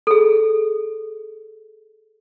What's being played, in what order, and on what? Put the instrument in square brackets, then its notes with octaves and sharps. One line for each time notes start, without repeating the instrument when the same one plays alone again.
[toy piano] G#4 A4